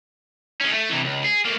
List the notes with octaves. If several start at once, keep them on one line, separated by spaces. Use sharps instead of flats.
G#3 C#4
A3
C3 E3
C#2
G#4
A3 A#3